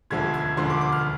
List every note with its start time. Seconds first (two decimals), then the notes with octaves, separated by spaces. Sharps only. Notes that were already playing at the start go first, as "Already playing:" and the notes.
0.10 E1 D2 D3 F3 G#6
0.34 G#6
0.57 E1 D2 D3 F3 C6
0.70 D6
0.81 D6
0.92 F6